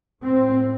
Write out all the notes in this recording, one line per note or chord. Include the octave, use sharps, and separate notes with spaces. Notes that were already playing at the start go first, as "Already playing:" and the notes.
A2 C4